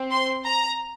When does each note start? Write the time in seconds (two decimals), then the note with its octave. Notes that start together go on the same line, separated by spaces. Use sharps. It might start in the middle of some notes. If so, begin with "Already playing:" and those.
Already playing: C4
0.12 C6
0.46 A#5